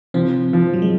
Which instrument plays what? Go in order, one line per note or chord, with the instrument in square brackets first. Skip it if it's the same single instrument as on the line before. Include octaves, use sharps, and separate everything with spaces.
[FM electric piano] C3 C4 [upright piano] F3
[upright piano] F3
[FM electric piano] F#3
G#3